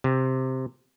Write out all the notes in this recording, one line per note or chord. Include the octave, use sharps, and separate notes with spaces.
C3